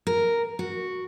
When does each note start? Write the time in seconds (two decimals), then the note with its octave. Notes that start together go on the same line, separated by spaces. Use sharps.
0.07 A#4
0.59 F#4